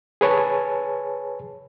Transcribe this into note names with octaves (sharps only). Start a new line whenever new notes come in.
G#4 B4 C#5 G#5 A5